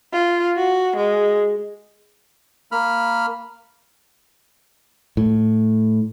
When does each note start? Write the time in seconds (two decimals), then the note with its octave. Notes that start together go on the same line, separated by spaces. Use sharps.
0.13 F4
0.57 F#4
0.97 G#3
2.72 A#3 B5 F6
5.17 A2